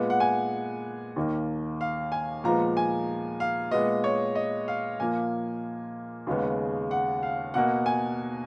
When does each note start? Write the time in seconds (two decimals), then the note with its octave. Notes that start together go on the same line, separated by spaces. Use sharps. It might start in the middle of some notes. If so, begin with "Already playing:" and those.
Already playing: A#2 G#3 B3
0.10 F#5
0.20 G#5
1.16 D#2 D#3 A#3
1.81 F5
2.12 G#5
2.44 A#2 F3 G#3 B3 A#5
2.77 G#5
3.40 F5
3.71 A#2 G#3 B3 D#5
4.04 C#5
4.35 D#5
4.68 F5
5.00 A#2 F3 A#3 G#5
6.27 D#2 C#3 G#3 B3
6.91 F#5
7.23 F5
7.54 B2 A#3 F#5
7.86 G#5